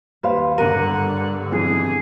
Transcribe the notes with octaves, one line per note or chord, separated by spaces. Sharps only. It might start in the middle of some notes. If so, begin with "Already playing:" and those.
D#2 B4 C5 F5
G1 G2 D3 A#4 F#5 D#7
B1 F2 E3 G#4